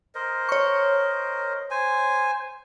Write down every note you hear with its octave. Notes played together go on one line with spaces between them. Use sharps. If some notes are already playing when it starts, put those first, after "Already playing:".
A#4 C5 D#5
C#5 C#6
C5 G#5